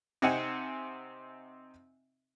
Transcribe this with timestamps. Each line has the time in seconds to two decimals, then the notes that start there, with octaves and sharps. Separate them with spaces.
0.22 C3 C4 D#4 F#5 G#5